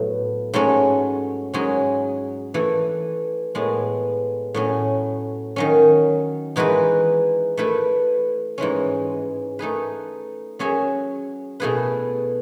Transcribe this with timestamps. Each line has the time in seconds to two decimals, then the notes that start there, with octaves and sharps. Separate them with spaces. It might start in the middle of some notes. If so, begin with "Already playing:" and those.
Already playing: A2 F#3 B3 E4
0.54 G#2 F#3 A3 C#4
1.54 G#2 F#3 C#4 G#4
2.54 E3 A3 E4
3.55 A2 G#3 B3
4.54 A2 F#3 C#4
5.56 D#3 F#3 C#4
6.56 E3 G#3 D#4 F#4 B4
7.57 A3 E4 B4
8.58 G#2 E3 G#3 C#4
9.59 A3 D#4 G#4 B4
10.59 F#3 C#4 G#4 C#5 E5
11.60 B2 A3 E4 G#4 B4